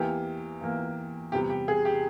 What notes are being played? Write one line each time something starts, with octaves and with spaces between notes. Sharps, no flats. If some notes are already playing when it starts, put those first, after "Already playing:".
Already playing: E2 E3 A#3 G4
E2 E3 A#3
E2 C3 G3 G4
G4
G#4
G4